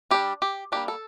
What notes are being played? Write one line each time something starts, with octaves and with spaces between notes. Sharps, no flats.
G3 D4 G4
G4
G3 A#3 D4 G4
A4